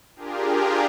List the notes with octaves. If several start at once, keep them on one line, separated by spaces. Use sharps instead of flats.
D4 F4 G4 G#4 A#4